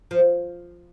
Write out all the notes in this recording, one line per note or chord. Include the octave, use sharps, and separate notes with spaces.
F3